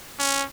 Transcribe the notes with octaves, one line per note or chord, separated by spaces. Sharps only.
C#4